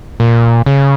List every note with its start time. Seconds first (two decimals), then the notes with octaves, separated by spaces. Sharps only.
0.20 A#2
0.66 C#3